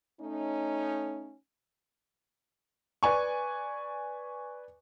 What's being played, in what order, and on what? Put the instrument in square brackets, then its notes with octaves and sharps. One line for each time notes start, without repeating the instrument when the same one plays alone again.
[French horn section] A3 C#4 D#4
[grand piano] B4 D5 G#5 C#6